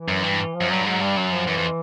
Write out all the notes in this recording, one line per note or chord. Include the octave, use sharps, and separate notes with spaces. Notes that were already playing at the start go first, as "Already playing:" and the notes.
Already playing: E3
F#2
G2
F3
F#2
G2 F#3
G#2 F#3
G2 G3
F#2 F#3
F3
F#2 E3
F2